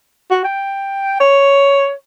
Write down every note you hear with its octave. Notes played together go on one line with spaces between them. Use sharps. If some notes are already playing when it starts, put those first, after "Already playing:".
F#4
G5
C#5